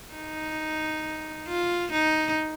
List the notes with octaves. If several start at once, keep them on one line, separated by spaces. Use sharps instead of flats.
D#4
F4
D#4